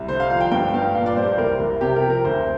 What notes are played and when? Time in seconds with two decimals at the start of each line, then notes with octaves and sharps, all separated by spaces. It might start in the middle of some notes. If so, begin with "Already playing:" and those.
Already playing: C2
0.08 D3 C5
0.20 F5
0.30 F3 F5
0.41 G5
0.51 G2 G5
0.74 G2 F5
0.95 A#2 F5
1.06 D5
1.16 G3 C5
1.27 C5
1.38 C2 A#4
1.60 C2
1.81 C3 G4
1.96 A#4
2.03 F3
2.10 A#4
2.24 D2 C5